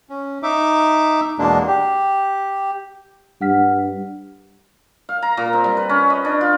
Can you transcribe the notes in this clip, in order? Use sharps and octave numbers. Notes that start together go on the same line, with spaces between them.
C#4
D#4 E5 D6
E2 B2 G#3 A#3 D4
G4
G2 F#5 F6 B6
F5
A#5
A#2
C4
G3
B4
C#4
D#5
D4
F4